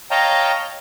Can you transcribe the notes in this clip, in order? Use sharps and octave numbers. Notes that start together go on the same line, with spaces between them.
C#5 D#5 F5 G5 A5 A#5